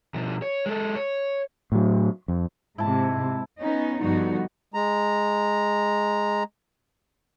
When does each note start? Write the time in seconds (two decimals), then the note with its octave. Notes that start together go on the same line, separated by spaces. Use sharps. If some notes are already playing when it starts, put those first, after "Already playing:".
0.14 B2 F3
0.42 C#5
0.66 G#3 A4
0.95 C#5
1.72 A2 F#3
2.28 F2
2.78 G#2 C3 E4 A5
3.60 B3 C#4 D#4
4.02 G2 D3 F3 B3 D#4 F#4
4.74 G#3 A#5